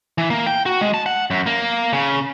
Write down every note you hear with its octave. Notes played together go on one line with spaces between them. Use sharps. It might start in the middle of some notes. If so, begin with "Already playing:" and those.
E3
A#3
G5
F#4
G#3
A5
F#5
F#2
A#3
C#3